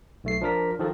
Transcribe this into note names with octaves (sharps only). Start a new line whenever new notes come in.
B1 A3 C7
F3 D4 A#4 B6
D#3 F3 A4 A#4